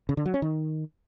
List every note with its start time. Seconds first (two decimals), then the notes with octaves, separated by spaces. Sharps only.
0.09 C#3
0.17 D3
0.26 F#3
0.34 C#4
0.42 D#3